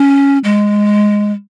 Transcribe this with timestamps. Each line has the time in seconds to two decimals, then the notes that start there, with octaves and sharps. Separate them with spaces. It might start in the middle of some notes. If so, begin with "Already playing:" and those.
Already playing: C#4
0.44 G#3